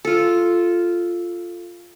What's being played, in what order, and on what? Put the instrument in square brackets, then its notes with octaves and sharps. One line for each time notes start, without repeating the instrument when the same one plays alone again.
[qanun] F4 A4